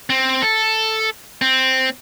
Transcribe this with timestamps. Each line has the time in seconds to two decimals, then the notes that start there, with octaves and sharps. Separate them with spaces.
0.10 C4
0.42 A4
1.41 C4